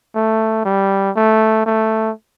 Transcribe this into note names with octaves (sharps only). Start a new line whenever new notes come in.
A3
G3
A3
A3